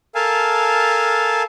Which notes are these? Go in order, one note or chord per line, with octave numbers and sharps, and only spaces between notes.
A4 A#4 F5 G#5 A5